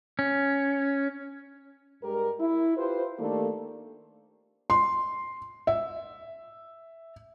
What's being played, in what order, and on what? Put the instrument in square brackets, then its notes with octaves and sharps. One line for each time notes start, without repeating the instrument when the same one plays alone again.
[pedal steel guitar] C#4
[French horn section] G2 G#3 G4 A#4
E4
F4 G4 B4 C5
D#3 A3 A#3 D4 G4 A4
[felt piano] C6
E5